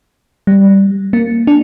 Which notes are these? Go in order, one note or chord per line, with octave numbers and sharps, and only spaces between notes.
G3
A#3
D4